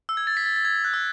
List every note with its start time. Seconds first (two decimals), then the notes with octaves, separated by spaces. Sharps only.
0.09 E6
0.17 G#6
0.27 A6
0.37 B6
0.46 A6
0.56 A6
0.65 G#6
0.84 F#6
0.94 E6